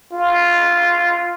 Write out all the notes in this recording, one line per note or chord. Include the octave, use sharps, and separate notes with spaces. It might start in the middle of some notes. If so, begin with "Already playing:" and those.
F4